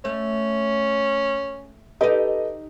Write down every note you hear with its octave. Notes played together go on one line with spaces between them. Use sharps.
A3 C#4
D#4 G4 A4 B4 D#5